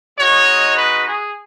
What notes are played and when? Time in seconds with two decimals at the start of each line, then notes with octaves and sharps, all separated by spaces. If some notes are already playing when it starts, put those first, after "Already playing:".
0.18 G#3 D#4 F#4 C#5
0.77 B4
1.07 G#4